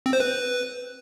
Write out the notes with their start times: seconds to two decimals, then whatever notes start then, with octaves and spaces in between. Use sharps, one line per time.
0.06 C4
0.13 C5
0.20 B4